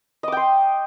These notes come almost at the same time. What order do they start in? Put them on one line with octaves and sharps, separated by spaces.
D#5 D6 G5 C6